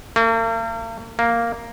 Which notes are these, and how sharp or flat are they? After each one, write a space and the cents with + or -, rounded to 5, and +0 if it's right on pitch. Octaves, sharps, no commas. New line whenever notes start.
A#3 -45
A#3 -5